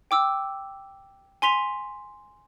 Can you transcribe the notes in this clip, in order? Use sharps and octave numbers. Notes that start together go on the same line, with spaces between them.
G5 D6 E6
G#5 C6 B6 F7